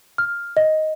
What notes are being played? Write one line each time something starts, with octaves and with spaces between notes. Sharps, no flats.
F6
D#5